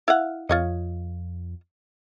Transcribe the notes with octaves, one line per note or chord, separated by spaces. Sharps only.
E4 F5 F#5
F2 F4 C#5 D#5